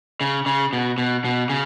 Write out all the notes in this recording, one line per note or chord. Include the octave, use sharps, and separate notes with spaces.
C#3
C#3
B2
B2
B2
C#3